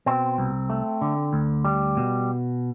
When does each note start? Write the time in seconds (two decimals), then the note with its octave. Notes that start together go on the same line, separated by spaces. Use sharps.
0.06 B2 C4
0.38 C2
0.70 A3
1.01 D3
1.33 D2
1.65 G3
1.97 B2